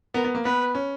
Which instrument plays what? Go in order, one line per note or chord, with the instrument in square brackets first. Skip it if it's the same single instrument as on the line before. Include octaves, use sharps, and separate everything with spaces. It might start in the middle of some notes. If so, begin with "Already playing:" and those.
[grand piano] B3 [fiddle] A#4
[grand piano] B3
A#3
[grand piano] B3 [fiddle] B4
[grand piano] C#4